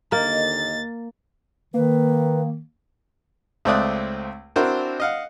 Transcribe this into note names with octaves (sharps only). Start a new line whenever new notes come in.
D#2 D3 A#3 D#5 A6
D#3 A#3 B4
C#2 A3 C4 D5 D#6 F#6
C4 D4 E4 F#4 A#4 C5
D#5 F5 F#5